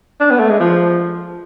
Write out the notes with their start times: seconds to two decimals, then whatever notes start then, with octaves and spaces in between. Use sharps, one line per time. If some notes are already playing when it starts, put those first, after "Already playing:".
0.20 D4
0.31 B3
0.40 A3
0.50 G#3
0.60 F3